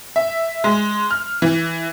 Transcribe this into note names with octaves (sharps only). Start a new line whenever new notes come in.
E5
G#3
F6
E3